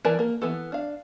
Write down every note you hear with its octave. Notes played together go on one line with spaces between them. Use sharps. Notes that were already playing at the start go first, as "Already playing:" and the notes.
E3 A#4 D5 G#5 A5
A#3 A#4
E3 B3 A4
D4 F5